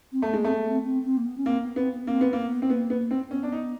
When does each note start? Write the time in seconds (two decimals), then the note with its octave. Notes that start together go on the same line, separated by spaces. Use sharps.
0.12 C4
0.22 A3 B3
0.33 G#3 A#3
0.44 A3 C4
0.54 B3
0.68 C4
0.84 C4
1.05 C4
1.17 A#3
1.26 B3
1.38 C#4
1.45 A#3 C4
1.62 B3
1.76 B3 C4
1.92 B3
2.07 A#3 C4
2.21 B3
2.33 A#3
2.38 B3
2.62 C4
2.70 A#3 B3
2.90 B3
3.11 C4
3.31 B3 C#4
3.43 D4
3.52 D#4